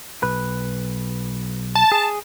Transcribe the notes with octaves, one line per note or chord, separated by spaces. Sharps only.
B1 B4
A5
G#4